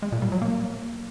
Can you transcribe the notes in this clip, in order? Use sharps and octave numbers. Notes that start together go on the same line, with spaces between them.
G#3
A#2
G3
F#3
A#3